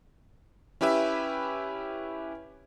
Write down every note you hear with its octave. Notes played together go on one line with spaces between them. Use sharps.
C#4 E4 G4 B4 E5